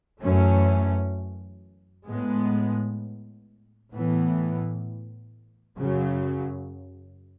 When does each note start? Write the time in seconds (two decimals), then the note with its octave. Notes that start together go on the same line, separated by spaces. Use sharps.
0.23 F#2 E3 A3 C#4
2.08 A2 G#3 B3
3.92 A2 E3 B3
5.77 F#2 C#3 F#3